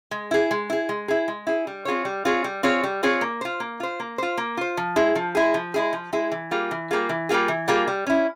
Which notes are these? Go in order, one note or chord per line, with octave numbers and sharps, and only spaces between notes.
G#3
E4 G#4
G#3
E4 G#4
G#3
E4 G#4
G#3
E4 G#4
G3
C4 F4 G#4 C#5
G3
C4 F4 G#4 C#5
G3
C4 F4 G#4 C#5
G3
C4 F4 G#4 C#5
A#3
F4 C5
A#3
F4 C5
A#3
F4 C5
A#3
F4 C5
F3
G#3 E4 G#4
F3
G#3 E4 G#4
F3
G#3 E4 G#4
F3
G#3 E4 G#4
E3
G3 A#3 F4 G#4
E3
G3 A#3 F4 G#4
E3
G3 A#3 F4 G#4
E3
G3 A#3 F4 G#4
G3
C#4 E4